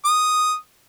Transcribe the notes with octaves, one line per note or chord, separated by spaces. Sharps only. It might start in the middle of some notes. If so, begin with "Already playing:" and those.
D#6